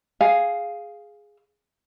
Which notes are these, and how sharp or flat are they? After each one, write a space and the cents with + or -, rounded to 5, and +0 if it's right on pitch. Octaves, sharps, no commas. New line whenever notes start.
G#4 +0 F5 +0